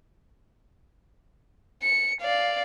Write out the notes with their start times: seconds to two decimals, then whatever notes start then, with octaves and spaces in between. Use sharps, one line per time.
1.83 C#7
2.21 D5 F5